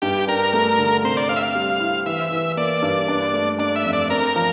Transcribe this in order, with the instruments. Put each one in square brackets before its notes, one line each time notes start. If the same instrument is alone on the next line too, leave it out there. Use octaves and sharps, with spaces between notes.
[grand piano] G2 [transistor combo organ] G4
[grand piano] D4 [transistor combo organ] A#4
[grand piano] A3
D3
[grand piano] C3 [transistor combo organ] C5
[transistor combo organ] D5
[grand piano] C4 [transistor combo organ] F5
[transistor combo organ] E5
F5
[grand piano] G3
E4
[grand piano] E3 [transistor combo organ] E5
[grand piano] E3
[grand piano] A#3 [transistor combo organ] D5
[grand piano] G2
D4
A3
[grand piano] D4 [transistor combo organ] D5
[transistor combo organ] E5
[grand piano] F2
[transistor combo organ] D5
[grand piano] C4 [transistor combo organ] A#4
[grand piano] F3